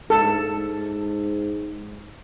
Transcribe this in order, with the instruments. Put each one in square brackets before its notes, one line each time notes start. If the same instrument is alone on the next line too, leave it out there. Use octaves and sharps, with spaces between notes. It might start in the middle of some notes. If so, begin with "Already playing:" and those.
[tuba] G#2 [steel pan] A4